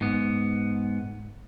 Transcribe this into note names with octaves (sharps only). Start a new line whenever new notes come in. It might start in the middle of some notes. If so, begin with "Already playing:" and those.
G#2 B3